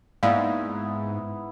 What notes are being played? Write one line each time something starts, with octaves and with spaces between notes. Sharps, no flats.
G#2 A#3 B3 E4 D5 F5